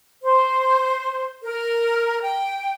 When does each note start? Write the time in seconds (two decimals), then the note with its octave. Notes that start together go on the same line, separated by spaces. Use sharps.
0.22 C5
1.42 A#4
2.21 G5